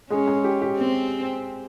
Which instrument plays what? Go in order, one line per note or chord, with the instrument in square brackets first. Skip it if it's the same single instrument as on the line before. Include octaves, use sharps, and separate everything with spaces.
[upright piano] G#3 G#4 [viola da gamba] C#4
[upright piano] G#3 G#4
G4
G4
[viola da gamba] C4